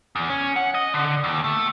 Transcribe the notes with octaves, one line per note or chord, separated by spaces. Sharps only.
E2
C#4
F#5
D#5
D3
D#2
A3